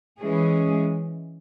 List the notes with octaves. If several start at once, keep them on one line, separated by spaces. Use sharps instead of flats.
E3 G#3 C#4 G#4